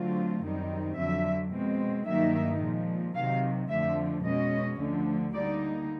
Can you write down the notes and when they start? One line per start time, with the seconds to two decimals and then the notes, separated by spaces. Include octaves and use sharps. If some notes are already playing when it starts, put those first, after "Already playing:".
Already playing: D3 F#3 A3 C4 F4
0.43 F#2 D#3 G3 C4 D#4
0.97 F2 D3 F#3 E5
1.52 B2 G#3 C4
2.06 G2 D#3 F#3 A#3 D#4 E5
2.60 A#2 F3 G#3
3.15 C3 D#3 F#3 F5
3.69 F2 D3 F3 A3 E5
4.24 B2 G#3 C#4 D#5
4.78 D2 D3 F3
5.33 D3 G3 A#3 D#4 D5